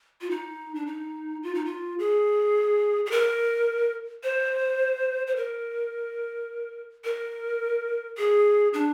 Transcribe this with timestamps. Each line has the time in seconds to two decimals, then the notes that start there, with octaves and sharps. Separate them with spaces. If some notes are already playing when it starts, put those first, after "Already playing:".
0.21 F4
0.31 D#4
0.75 D4
0.87 D#4
1.43 F4
1.55 D#4
1.65 F4
1.99 G#4
3.06 G#4
3.11 A#4
4.24 C5
5.27 C5
5.36 A#4
7.04 A#4
8.18 G#4
8.74 D4